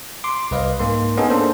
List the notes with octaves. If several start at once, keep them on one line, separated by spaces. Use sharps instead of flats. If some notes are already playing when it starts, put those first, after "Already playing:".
C6 D6
C2 B4 D#5 F5
G#2 A#3 C6
B3 C#4 D#4 G#4 A4
A#3 D4 A4 C5